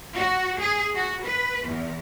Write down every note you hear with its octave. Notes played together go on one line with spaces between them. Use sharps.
F#4
G#4
F#4
B4
E2